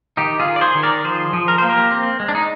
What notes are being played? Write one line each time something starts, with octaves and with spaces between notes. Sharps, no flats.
D#3 D#4 G4
F4 G#4
D#3
D5
G#4 C5
D#3
A#4 D5
F3 G#4 C5
F3
A#4
A#3 C5
G4 A#4
C4
G#3
D4
D#4